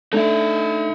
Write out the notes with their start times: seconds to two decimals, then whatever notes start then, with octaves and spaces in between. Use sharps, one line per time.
0.13 A3 D4 D#4 A4 E5